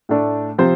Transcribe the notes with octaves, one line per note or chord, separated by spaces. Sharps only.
A2 A3 D4
C3 F3 C4 C5